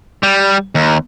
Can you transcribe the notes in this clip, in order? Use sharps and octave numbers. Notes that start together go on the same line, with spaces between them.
G3
D#2